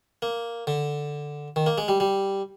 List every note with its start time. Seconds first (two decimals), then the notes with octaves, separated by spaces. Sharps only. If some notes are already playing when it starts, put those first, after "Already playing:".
0.22 A#3
0.67 D3
1.56 D#3
1.67 A#3
1.78 G#3
1.88 G3
2.00 G3